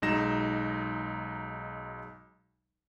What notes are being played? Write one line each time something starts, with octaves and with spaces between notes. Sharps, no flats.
B1 F#3 G#3 D#4 A#6 E7